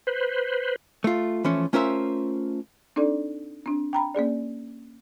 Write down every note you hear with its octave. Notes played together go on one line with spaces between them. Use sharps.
B4 C5
A3 F4
E3 F3 A3 C#4
A3 C#4 F4 A#4 C5 E5
C4 D4 D#4 A4 D5
C4 D4
G5 A#5 B5
A#3 C#4 G#4 D5